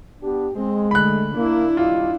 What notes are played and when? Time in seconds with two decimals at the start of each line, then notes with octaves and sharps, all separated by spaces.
0.22 B3 D4 G4
0.56 G#3 C4
0.91 D3 A3 B5 F#6
1.36 A#3 D4 E4
1.77 G2 C3 D#3 F4